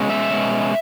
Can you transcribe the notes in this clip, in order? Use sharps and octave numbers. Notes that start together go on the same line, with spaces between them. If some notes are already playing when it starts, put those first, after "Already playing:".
Already playing: B2 G#3 C#4
E5
B2 G#3 C#4